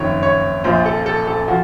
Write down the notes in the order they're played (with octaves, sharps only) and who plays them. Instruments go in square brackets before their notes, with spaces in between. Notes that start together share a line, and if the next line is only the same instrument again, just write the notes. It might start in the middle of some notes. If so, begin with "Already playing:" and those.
Already playing: [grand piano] F#1 F2 D#3 C#5
C#5
A#1 A#2 F3 C5
A4
A4
A4
F3 F#4